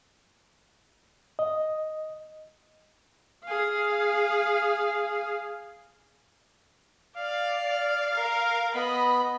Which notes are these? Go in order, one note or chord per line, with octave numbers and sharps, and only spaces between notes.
D#5
G#4 F5
D5 F5
A#4
B3 D#5 B5